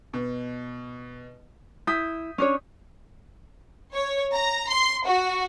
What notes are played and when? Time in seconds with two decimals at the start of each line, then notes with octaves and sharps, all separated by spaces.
0.13 B2
1.87 E4 D#6 G6 B6
2.38 C#4 D4 C#5
3.94 C#5
4.33 A#5
4.71 C6
5.07 F#4